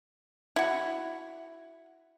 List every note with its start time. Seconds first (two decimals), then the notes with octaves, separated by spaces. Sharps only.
0.56 E4 F#4